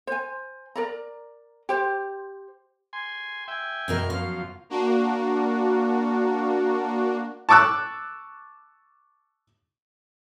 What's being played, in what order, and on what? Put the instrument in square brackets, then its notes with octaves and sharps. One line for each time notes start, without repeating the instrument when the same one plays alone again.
[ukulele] C5 G#5
A#4 D5 A#5
G4 C5
[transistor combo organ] G#5 C6
E5 G5 G#5
[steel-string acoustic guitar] F#2 B2 A#4
[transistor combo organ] F#2 F3 [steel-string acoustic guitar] F5
[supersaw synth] A#3 D4 F#4
[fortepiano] A5 C#6 D6 E6 F#6